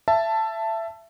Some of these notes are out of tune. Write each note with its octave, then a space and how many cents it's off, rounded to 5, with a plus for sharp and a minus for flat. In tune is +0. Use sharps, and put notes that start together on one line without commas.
E5 +20 A5 +5